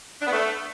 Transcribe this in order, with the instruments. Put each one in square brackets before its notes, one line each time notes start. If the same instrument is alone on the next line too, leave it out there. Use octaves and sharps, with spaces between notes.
[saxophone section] D4
B3
A3